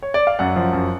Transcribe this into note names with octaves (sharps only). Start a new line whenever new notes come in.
C#5
D5
F5
F#2 F#5
F3
F#2